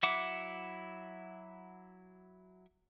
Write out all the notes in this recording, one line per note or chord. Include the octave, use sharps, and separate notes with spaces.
F#3 E4 E5 F#5 D6